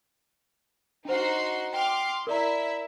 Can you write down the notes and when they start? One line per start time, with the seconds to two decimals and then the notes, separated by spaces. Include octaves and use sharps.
1.05 D4 D#4 F#4 C5 C6
1.73 G5 C6 D6 F6
2.27 E4 A#4 D5 E5 A#5